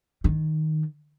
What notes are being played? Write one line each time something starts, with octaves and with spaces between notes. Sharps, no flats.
D#3